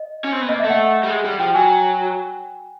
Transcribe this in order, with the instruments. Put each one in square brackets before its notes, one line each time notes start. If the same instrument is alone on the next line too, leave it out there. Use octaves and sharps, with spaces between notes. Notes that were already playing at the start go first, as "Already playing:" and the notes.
Already playing: [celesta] D#5
[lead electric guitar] C#4
C4
B3
[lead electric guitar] A#3 [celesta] D#5
[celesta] E5
[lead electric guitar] A3
[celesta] F#5
[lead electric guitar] G3
G#3
G3
[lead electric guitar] F3 [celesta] G5
[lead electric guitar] F#3 [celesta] G#5